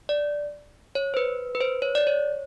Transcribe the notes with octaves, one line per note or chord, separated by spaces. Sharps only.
D5
C#5
C5
B4
B4
C5
C#5
D5
C#5